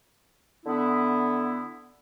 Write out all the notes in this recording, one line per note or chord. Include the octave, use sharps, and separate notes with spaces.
D3 B3 E4